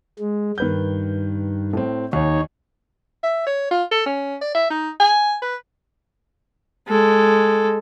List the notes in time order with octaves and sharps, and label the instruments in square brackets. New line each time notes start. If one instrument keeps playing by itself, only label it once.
[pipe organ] G#3
[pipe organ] G2 [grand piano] D#3 B4 G6
[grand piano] A2 C4
[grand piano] D#2 [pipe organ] D#4 C#5
[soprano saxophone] E5
C#5
F4
A4
C#4
D5
E5
D#4
G#5
B4
[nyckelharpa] G#3 A4